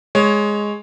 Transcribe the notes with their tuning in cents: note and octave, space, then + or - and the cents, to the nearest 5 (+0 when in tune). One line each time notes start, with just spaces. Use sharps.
G#3 +0 C#5 +0